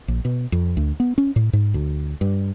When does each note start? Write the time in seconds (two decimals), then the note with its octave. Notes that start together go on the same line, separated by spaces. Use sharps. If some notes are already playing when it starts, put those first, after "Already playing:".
0.08 A#1
0.25 B2
0.52 F2
0.77 D2
1.00 B3
1.18 C#4
1.36 A2
1.53 G#2
1.74 D2
2.21 G2